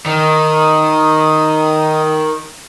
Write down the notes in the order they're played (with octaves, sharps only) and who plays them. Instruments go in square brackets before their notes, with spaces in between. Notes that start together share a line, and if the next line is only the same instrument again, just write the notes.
[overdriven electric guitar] D#3 [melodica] D#4 D#6